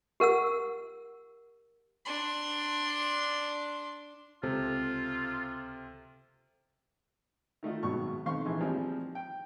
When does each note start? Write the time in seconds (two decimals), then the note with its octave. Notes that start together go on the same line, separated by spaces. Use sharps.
0.20 G4 A#4 F#5 E6
2.05 D4 C6
4.43 C#2 C3 F4 A4 C5
7.63 D#3 A3 D#4 F4
7.83 G#1 B2 F#3 C#6
8.26 B1 C4 F5 C6 C#6
8.45 A#1 E3
8.61 F3 G3 C4 D#4 G#4 D#5
9.15 G5